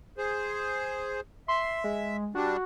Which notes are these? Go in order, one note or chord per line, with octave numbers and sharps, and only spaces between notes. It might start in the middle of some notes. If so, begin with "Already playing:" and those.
G#4 C5
E5 C6
G#3
G3 D4 F#4